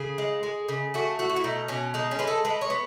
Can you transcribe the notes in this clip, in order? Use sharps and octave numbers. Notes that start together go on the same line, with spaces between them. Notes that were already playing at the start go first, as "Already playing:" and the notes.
Already playing: C#3 G#4
G#3
G#3
C#3
A3 F#4
A3 F#4
F#4
E4
B2 D#4
B2 C#4
G#3 D#4
C#4
G#3 B4
A4
G#3 B4
C#5
B3